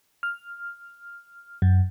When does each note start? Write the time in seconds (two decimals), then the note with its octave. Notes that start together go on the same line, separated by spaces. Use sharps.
0.23 F6
1.62 F#2